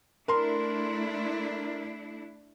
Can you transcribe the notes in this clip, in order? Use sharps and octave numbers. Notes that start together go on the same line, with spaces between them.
A3 D4 E4 A#4 C6